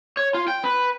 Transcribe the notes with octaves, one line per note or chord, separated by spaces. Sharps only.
C#5
F4
G5
B4